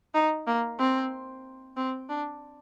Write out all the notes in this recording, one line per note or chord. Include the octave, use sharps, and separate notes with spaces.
D#4
A#3
C4
C4
D4